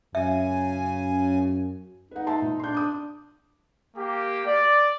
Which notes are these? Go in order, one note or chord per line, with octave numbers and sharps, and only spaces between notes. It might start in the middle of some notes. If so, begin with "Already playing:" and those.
F#2 C#3 E5 G#5
D#4 B4 F#5
E5 A5 C6
A#2
D4 C6 G6
D6 D#6
A#3 G4
D5